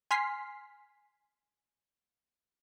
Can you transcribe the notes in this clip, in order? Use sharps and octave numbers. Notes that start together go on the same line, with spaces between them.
G#5 C6 F6 B6 C7